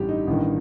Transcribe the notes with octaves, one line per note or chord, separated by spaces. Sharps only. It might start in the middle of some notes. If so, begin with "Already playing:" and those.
Already playing: A1 G2 D3 G4
D#4
A1 G2 D#3